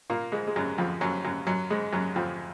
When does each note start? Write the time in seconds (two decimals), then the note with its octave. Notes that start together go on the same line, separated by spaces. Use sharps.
0.10 A#2 A#3
0.32 G#2 G#3
0.47 G#3
0.56 F#2 F#3
0.78 F2 F3
1.01 F#2 F#3
1.25 F#2 F#3
1.47 F#2 F#3
1.70 G#2 G#3
1.93 F#2 F#3
2.16 F2 F3